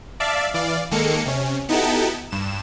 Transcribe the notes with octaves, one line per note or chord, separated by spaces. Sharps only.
D5 E5 F5 A5
E3 D5 F5
D#2 D#3 G#3 A#3 A4 C#7
C3 C#4
B3 D#4 E4 F#4 G4 A4
G2 E7